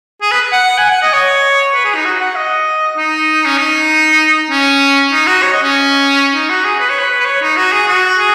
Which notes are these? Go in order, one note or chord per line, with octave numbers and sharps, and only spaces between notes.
G#4
B4
F#5
G#5
F#5
D#5
C#5
B4
G#4
D#4
F#4
F#5
D#5
D#4
C#4
D#4
C#4
D#4
F#4
C#5
D#5
C#4
D#4
F#4
G#4
B4
C#5
B4
B4
C#5
D#4
F#4
G#4
F#4
G#4